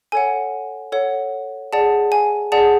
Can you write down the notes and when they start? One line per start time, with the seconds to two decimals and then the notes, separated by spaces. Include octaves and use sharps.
0.12 A4 C#5 F#5 G#5
0.92 A4 C#5 F#5
1.73 G#4 D5 F#5 A5
2.12 G#5
2.52 G#4 D5 F#5 A5